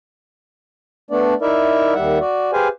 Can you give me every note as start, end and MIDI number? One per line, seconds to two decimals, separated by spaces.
1.11 1.34 57
1.11 1.34 59
1.11 1.34 62
1.11 1.34 74
1.41 1.94 63
1.41 1.94 64
1.41 1.94 70
1.41 1.94 74
1.41 1.94 76
1.94 2.19 39
1.94 2.19 55
1.94 2.19 76
1.94 2.19 78
2.20 2.51 66
2.20 2.51 74
2.53 2.68 67
2.53 2.68 68
2.53 2.68 71
2.53 2.68 72
2.53 2.68 77
2.53 2.68 80